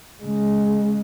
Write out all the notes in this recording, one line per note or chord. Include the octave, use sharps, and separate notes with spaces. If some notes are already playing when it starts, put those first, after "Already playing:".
C#3 G#3